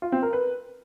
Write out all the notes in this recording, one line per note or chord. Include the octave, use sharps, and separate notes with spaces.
F4
C4
A#4
B4